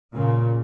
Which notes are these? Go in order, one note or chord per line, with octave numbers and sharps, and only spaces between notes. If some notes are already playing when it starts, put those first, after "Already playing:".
A#2 C#3